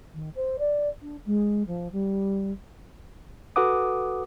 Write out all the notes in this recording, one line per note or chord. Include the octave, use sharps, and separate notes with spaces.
D#3
C5
D5
D4
G#3
F3
G3
F#4 A4 B4 F#5 D6 D#6